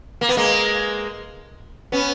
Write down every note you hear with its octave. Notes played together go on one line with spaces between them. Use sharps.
A#3
B3
G#3 A#3
B3 C#4